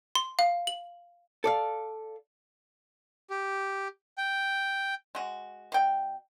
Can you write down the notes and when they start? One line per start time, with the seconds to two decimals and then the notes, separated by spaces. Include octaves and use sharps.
0.15 C6
0.39 F5
0.67 F#7
1.44 A4 D5 F5
3.30 G4
4.18 G5
5.15 G#3 F#4
5.72 B2 G5